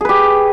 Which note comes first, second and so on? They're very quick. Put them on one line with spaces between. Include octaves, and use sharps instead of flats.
G#4 B4 G4